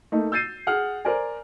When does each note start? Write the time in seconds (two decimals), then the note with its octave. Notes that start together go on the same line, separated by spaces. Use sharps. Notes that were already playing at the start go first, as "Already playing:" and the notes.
0.12 A3 A#3 D#4
0.32 E6 G6 A6 C7 D#7
0.67 G#4 F#5 F6
1.05 A#4 C5 D5 G#5